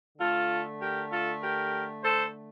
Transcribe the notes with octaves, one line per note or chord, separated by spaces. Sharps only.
D3 A3 F4 A4
G4 A#4
F4 A4
G4 A#4
A4 C5